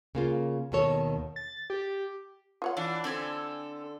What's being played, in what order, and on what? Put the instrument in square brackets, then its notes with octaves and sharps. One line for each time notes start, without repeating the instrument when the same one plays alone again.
[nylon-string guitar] C#3 A#3 F4
D#2 B2 D#3 A4 C#5
[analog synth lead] A6
G4
[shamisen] F4 C#5 F#5
[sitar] E3 [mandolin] D4
[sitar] D3 [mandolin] C4 A4 G#5